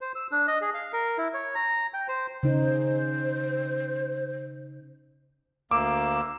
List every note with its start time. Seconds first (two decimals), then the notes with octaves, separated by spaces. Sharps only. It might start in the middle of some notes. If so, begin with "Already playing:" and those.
0.01 C5
0.15 E6
0.31 D4
0.48 D#5
0.61 G#4
0.74 F5
0.93 A#4
1.18 E4
1.34 C#5
1.55 A#5
1.94 G5
2.08 C5
2.43 C#3 D#4 C5
5.71 D2 A#3 D6 E6